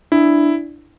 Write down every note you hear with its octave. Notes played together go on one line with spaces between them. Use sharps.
D4 E4